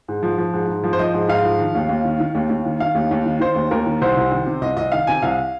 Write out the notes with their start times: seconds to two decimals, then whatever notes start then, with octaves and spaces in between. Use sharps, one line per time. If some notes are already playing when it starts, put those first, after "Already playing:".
0.08 G#2
0.23 F3
0.38 F3
0.53 G#2
0.68 G#2
0.84 F3
0.93 C5
0.99 F3 D#5
1.14 G#2
1.28 G#2 F5
1.44 F3
1.59 D#3
1.75 D#2
1.89 D#2
2.04 D#3
2.20 D#3
2.35 D#2
2.50 D#2
2.66 D#3
2.80 D#3 F5
2.95 D#2
3.11 D#2
3.26 D#3
3.40 D#3 C5
3.56 D#2
3.71 D#2 A#4
3.86 D#3
4.01 C2 C5
4.17 C2
4.31 D#3
4.46 C3
4.61 C2 D#5
4.76 C2 D#5
4.92 D#3 F5
5.07 C3 G#5
5.22 C2 F5